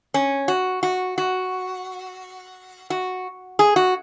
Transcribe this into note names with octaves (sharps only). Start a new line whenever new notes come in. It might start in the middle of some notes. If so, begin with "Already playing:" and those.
C#4
F#4
F#4
F#4
F#4
G#4
F#4